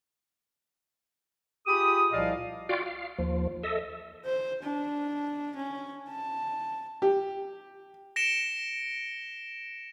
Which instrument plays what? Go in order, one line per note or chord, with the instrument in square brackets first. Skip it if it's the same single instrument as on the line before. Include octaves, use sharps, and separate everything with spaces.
[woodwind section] F4 G4 G#4 B5 D#6
C2 A#2 F3 D5 D#5 F5
[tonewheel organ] F4 F#4 D5 F5 G5
F5
D#2 F3
A4 D#5 E5
[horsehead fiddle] C5
D4
C#4
A5
[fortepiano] G4
[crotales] A#6 C#7 D7 E7 G7